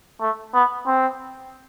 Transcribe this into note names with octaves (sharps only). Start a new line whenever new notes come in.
A3
B3
C4